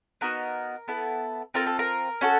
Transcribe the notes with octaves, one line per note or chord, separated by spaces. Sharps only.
B3 D#4 F#4 A#4
B3 E4 A4
C4 F4 A4 A#4
A4
A#4
C#4 F#4 A4